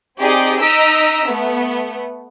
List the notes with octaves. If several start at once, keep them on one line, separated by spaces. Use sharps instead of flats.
C4 D#4 G4 G#4 D5 D#5
D#4 D#5 A#5 E6 B6 D7
A3 B3